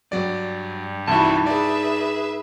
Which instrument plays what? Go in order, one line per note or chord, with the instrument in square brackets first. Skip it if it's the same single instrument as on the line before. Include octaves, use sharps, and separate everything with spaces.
[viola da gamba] G2 [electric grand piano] F#3 D5
[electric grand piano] C2 E5 [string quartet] E3 E4 F#4 [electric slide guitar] D#4 A5
[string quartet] G#4 B4 E5 [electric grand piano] D5